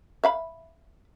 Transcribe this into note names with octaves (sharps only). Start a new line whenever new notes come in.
E5 F5 B5